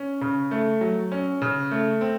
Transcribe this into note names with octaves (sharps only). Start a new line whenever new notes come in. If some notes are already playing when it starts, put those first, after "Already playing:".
Already playing: C#4
C#3
A3
F#3
C#4
C#3
A3
C4